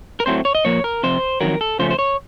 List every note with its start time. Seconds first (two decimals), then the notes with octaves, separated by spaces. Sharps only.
0.20 A#4
0.26 A2 F#3 A3 C4 C5
0.45 C#5
0.55 D#5
0.65 A#2 F3 A#3 C#5
0.84 A#4
1.03 F2 C3 C5
1.41 F2 D#3 F#3 A#4
1.61 A4
1.79 C#3 F3 A3 C#4 C5
1.90 C5
1.99 C#5